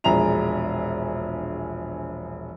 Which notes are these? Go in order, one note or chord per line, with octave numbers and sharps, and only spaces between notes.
E1 A#1 G#4 E5 A#5 F7